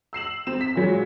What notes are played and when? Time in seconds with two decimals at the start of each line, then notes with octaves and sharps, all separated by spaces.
0.13 E6 C7 E7 F#7
0.47 C4 E7
0.61 B6
0.75 A#2 F#3 G#3